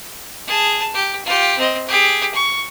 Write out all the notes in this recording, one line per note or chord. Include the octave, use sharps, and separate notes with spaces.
G#4 A5
G4
F4 G4
C4 D#5
G4 G#4
C#6